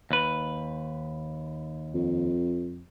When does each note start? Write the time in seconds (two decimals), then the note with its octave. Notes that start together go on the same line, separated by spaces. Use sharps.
0.11 D#2 B4
1.94 F2